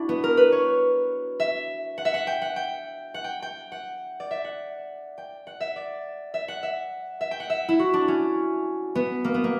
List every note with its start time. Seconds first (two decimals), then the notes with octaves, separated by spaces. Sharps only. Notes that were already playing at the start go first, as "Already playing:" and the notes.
Already playing: D4 E4 F#4
0.09 B3
0.24 A#4
0.37 B4
0.52 C#5
1.40 E5
1.98 F#5
2.05 E5
2.14 F#5
2.27 G5
2.42 F#5
2.56 G5
3.14 F#5
3.24 G5
3.42 G5
3.72 F#5
4.20 D5
4.31 E5
4.44 F#5
5.18 G5
5.47 F#5
5.60 E5
5.76 D5
6.34 E5
6.48 F#5
6.63 E5
7.21 E5
7.31 G5
7.40 F#5
7.50 E5
7.69 E4
7.79 F#4
7.93 D4
8.08 C#4
8.95 B3
9.24 A#3
9.34 B3
9.44 A#3